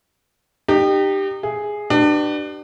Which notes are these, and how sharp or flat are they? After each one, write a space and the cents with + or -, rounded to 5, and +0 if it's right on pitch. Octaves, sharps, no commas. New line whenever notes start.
D#4 -35 G4 +0
G#4 +0 E5 +0
D4 +30 G4 -35 B4 +0